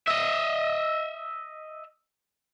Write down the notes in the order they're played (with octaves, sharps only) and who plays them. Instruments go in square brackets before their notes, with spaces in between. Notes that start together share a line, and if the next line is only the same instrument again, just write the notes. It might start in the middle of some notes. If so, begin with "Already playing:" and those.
[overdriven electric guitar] D#5 E5